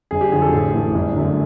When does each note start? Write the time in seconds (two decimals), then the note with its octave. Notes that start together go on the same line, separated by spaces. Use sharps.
0.11 G1 G#4
0.21 G4
0.32 F2 D3 F#3 G#4
0.42 A4
0.53 A1 G#4
0.74 A2 E3
0.95 G1
1.16 F#2 D3 F#3 A3